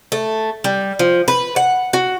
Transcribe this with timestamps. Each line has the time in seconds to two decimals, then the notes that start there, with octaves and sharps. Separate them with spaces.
0.12 A3
0.64 G3
0.99 F3
1.28 B4
1.56 F#5
1.93 F#4